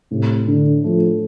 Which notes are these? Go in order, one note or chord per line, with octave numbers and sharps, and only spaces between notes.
A2 C3
D3 D4
F3 A3